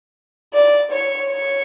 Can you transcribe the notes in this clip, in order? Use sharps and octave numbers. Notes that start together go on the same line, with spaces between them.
D5
C#5
C#5